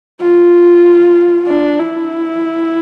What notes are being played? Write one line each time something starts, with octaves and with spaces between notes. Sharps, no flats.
F4
D4
E4